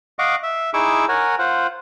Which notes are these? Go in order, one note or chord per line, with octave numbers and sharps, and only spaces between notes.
D#5 F5 F#5 C#6 D6
E5
D#4 E4 G#4 C#6 D6 E6
A#4 C#5 F#5 G#5
F4 C5 F#5